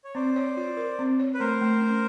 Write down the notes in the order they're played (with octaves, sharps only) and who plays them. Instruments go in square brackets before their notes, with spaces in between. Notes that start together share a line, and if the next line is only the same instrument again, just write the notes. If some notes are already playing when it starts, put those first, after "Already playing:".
[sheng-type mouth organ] C#5
[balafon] C4 [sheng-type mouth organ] C5 D5
[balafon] C#5
F4
A#4
C4
C#5
[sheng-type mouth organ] B4
[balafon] A3 [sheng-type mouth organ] A#4 C5
[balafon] A3
C#4